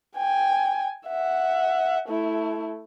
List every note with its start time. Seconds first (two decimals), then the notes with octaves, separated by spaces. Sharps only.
0.17 G5 G#5
1.07 E5 F#5
2.09 A3 E4